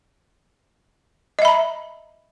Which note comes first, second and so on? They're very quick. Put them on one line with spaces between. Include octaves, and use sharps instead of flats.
D#5 E5 B5 A#5